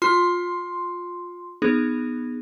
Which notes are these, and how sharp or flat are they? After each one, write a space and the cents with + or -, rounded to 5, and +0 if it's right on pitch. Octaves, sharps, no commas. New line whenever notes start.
F4 +20 C6 +0
B3 +0 D#4 -20 G#4 +0